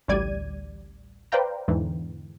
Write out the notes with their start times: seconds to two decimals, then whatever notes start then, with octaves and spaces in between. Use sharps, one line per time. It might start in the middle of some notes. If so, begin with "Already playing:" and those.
0.08 A1 D2 G3 D5 G#6 D#7
1.32 B4 C5 D5 F5 G5 A#5
1.68 E2 G#2 D3 E3